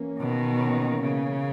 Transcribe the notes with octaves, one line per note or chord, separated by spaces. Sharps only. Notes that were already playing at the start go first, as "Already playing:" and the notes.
Already playing: E3 A#3 C#4
B2 D#3
E3 A#3 C#4
C#3